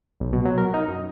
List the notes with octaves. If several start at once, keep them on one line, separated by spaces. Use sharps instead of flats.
B1
B2
F#3
A#4
D#4
F#2